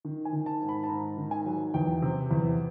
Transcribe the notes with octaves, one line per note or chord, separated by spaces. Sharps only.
D#3
G#5
D#3
A5
G#2
B5
A5
G#2 A#5
D#3
G#5
F#3
E2 G5
C3
E2